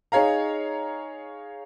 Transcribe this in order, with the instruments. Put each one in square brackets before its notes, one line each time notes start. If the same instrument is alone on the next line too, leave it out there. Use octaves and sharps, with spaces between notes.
[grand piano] D#4 G#4 C#5 F5 A#5